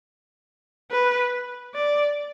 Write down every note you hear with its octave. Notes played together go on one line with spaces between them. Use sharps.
B4
D5